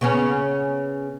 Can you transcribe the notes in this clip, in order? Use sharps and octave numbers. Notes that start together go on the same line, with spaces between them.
C#3 B3 C#4